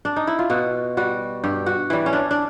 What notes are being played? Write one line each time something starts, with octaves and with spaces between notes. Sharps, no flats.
D4
D#4
E4
F4
B2 F#4
G3 F#4
G2 G4
F#4
E3 G3
C#4
D4
D4